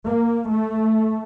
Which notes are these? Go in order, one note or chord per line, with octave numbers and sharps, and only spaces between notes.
A#3
A3